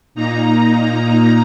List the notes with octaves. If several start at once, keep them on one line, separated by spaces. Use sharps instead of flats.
A#2 A#3 D#4 A#5